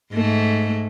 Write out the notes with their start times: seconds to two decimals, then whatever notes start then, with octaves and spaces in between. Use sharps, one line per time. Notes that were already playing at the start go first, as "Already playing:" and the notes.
0.13 G#2 A3